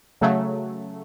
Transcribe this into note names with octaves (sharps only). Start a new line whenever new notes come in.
C#3 F#3 A3